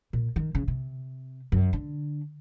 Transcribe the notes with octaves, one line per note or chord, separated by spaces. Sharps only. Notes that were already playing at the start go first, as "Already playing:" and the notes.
A#2
D#3
C#3
C3
F#2
D3